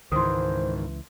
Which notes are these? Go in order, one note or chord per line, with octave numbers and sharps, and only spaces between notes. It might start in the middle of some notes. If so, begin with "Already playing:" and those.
C#2 G#2 D#3 E3 C5 C6 D#6